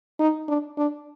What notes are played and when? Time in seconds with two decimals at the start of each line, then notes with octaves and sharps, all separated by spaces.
0.20 D#4
0.48 D4
0.78 D4